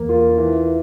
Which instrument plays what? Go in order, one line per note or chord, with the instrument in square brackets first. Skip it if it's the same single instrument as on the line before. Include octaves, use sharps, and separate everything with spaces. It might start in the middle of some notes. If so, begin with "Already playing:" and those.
Already playing: [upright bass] E2 [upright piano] A#3
[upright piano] F4
E3